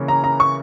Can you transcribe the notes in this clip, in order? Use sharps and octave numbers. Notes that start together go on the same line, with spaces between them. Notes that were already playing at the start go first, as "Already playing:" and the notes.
Already playing: C#3 E3 A#3 C#4
A#5
A#5
C#6